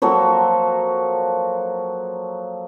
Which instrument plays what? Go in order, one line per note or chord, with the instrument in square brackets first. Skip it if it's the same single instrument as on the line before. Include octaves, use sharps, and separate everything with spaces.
[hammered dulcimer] F3 F#3 A#3 A4